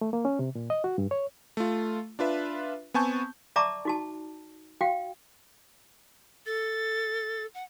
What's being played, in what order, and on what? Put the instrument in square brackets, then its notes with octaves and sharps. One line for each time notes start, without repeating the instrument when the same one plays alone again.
[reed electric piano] A3
A#3
C#4
C3
A#2
D#5
F#4
G2
C#5
[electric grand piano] A3 F4
D4 F4 B4 E5
B3 C4 G#5 A5 C#6 G6
[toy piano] D5 E5 A5 A#5 C#6 D6
D#4 F#4 A5
F#4 F5 G5
[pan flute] A4 [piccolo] A6
[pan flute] F#5